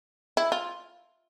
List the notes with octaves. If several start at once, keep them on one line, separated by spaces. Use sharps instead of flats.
E4
F4